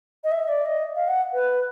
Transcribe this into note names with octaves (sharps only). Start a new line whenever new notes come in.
D#5
E5
D5
D#5
F5
F#5
B4